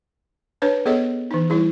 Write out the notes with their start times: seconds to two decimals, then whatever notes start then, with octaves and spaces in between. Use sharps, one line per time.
0.62 D4 B4 C#5 A5
0.86 B3 G#4 A4 C#5 D#5
1.31 E3 D#4
1.50 G3 E4 G#4